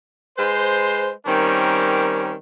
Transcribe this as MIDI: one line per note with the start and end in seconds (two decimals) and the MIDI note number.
0.38 1.11 56
0.38 1.11 71
0.38 1.11 72
1.27 2.33 51
1.27 2.33 55
1.27 2.33 60
1.27 2.33 61
1.27 2.33 70